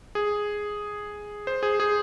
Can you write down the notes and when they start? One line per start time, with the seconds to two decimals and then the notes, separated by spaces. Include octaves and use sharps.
0.15 G#4
1.47 C5
1.63 G#4
1.80 G#4